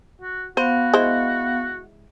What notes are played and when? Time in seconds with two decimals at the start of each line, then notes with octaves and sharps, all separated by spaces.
0.21 F#4
0.57 B3 F#4 C5 F5 F#5
0.94 G#3 E4 C5